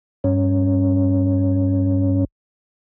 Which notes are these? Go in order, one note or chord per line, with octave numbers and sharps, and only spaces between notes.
G2 C#4